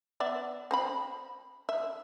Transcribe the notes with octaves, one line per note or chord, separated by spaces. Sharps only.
B3 D5 E5
C4 C5 B5
E5